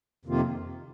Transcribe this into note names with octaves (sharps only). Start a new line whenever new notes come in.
F2 C3 D#3 A#3 F4